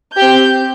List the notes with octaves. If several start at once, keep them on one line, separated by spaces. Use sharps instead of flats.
C4 G4 G6